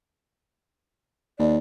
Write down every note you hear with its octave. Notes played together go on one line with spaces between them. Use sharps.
D#2 D5